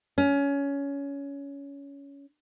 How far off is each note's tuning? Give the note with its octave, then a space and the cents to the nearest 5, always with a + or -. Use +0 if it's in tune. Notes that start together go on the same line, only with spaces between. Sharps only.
C#4 +20